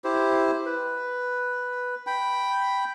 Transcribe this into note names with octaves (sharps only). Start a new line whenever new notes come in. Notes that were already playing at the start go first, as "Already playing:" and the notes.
E4 G4 C5
B4
G5 B5